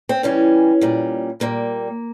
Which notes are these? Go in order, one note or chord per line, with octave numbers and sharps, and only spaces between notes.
C4
C#3 E3 G3 C#4
A#2 G3
A#2 G3 A#3